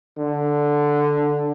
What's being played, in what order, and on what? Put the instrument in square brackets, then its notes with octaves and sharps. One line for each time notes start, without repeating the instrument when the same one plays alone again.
[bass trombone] D3